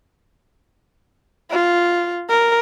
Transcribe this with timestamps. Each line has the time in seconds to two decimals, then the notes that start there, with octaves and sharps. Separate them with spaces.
1.51 F4
2.29 A#4